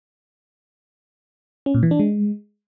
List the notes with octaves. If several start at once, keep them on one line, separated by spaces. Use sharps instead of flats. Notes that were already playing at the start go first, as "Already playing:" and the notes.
C#4
A#2
E3
D4
G#3